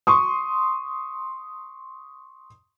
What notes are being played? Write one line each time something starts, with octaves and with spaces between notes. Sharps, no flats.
C6 C#6 D#6